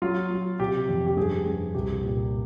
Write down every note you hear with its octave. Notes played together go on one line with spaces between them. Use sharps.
F#3 F4
F#3
C3 G4
F2
G4
G2 G#4
G2
C2 G4
A#2